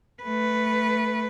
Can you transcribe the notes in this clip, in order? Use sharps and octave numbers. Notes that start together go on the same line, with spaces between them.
A3 B4